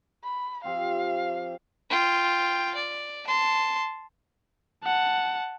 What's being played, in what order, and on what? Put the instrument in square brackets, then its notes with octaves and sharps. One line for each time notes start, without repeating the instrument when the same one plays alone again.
[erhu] B5
[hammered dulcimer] F3 C4 G4 [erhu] F5
[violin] F4 G5
D5
A5 C6
[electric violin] F#5 A5